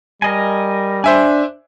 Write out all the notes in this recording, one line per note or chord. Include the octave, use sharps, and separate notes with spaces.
G3 A#4 D#5 G#5
D4 C5 E5 G#5